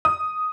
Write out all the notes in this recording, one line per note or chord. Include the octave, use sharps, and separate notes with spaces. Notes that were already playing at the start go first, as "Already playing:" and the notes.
D#6